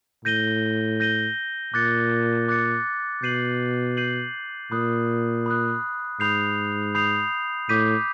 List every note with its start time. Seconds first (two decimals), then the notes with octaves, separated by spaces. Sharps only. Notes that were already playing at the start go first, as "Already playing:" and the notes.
0.25 A2 G6 A#6 D#7 G7
1.00 G6 A#6 D#7 G7
1.74 A#2 D6 F#6 A6 C#7
2.48 D6 F#6 A6 C#7
3.23 B2 G6 C7 D#7 F#7
3.97 G6 C7 D#7 F#7
4.72 A#2 B5 D#6 F#6
5.46 B5 D#6 F#6
6.20 G#2 B5 D#6 G6 C7 F7
6.95 B5 D#6 G6 C7 F7
7.69 A2 D6 G6 B6 D#7